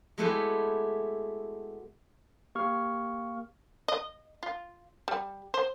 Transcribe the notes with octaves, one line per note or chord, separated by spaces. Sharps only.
G#3 A3 B3 E4 F#4 G4
A#3 G4 C#6 F6
D#5
F4
G3
C5